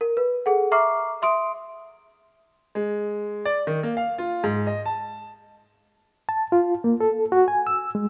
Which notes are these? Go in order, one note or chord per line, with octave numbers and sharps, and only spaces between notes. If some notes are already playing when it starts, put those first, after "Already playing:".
A#4
B4
G#4 A4 F#5
E5 A#5 C#6 D6 F6 C7
E5 C6 D#6 D7
G#3
D5
D#3
A#3
F5
F4
G#2
D#5
A5
A5
F4
A#3
A4
F#4
G#5
E6
G#3